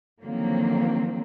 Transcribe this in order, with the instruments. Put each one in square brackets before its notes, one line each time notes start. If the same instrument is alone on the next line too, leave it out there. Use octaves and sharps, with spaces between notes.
[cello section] D3 D#3 F3 F#3 A#3 C4